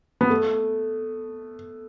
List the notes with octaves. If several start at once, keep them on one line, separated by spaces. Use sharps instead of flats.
B3
A3